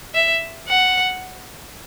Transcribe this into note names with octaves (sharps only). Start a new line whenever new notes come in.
E5
F#5